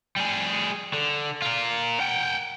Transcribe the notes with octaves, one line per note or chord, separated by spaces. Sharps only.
G3 G#4
D3
F4 A#4
F#5 G5